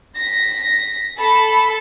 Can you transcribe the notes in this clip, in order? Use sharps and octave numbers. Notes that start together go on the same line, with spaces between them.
A#6 B6
A4 B5